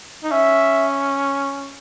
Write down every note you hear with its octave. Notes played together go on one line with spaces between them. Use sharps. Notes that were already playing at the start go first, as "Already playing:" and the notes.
D#4
C#4 E5